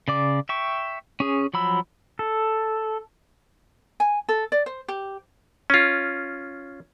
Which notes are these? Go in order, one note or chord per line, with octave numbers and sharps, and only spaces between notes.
C#3 D5 D6
E5 G5 C#6
C#4 G#4
F3 F#3 B5 E6
A4
G#5
A4
D5
C5
G4
C#4 F4